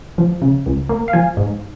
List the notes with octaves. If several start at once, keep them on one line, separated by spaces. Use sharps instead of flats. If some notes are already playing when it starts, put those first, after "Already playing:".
F3
C#3
C#2
A#3
F5
F3 G#5
G#2